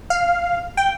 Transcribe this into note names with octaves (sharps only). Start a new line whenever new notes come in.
F5
G5